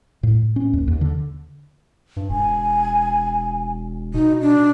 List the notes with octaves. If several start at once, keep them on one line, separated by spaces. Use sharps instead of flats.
A2
C#4
D#2
D#2
D3
G2
E1 G#5
B2 D#4
D4